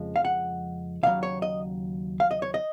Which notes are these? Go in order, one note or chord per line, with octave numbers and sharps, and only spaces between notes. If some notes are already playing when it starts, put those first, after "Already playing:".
Already playing: F2 C#3 F3 G#3
F5
F#5
D#2 C#3 F#3 F5
C#5
D#5
F5
D#5
C#5
D#5